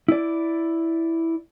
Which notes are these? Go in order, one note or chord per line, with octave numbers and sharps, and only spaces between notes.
E4 D5